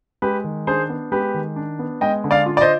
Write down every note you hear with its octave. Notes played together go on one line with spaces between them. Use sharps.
G#3 G4 B4
D#3
D4 G#4 C5
B3
G#3 G4 B4
D#3
D4
B3
G#3 D#5 G5
D3
D5 F5
F4
D5
C5 D#5